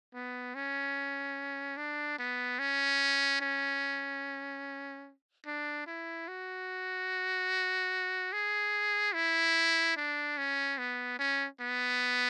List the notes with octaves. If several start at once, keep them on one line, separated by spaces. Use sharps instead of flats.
B3
C#4
D4
B3
C#4
C#4
D4
E4
F#4
G#4
E4
D4
C#4
B3
C#4
B3